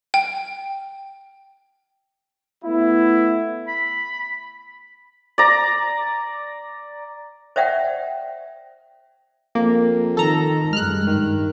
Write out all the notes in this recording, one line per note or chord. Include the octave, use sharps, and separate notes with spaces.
G5
A3 B3 E4
B5
D5 A#5
C5 D5 E5 F#5 G5
F2 A#3
D#3 A4 A#5
F#2 G3 G#3 F6 F#6
G2 D#3